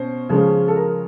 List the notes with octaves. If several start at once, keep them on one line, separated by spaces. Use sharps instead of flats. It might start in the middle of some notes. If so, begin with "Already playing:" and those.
Already playing: B2 C#4 C5
C#3 F3 G#3 C#4
A4
A#4